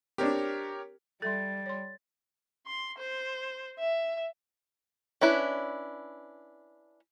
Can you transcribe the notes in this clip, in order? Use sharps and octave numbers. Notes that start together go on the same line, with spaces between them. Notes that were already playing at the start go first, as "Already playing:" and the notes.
C4 D4 G4 A#4 C#5
G3 A4 E5 C6 A6
C#5 C6
C6
C5
E5
C#4 D4 E4 B4